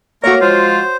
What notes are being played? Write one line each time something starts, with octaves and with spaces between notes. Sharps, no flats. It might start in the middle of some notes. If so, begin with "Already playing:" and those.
A3 A#3 F#4 A#4 C#5 C#6
F3 G#3 F4 C5